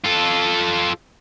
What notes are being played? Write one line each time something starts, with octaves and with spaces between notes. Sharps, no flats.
F4 A4